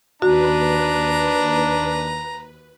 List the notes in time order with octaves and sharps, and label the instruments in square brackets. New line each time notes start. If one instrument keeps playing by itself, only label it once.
[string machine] D#2 B4 [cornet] D4 [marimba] F#4 [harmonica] A#5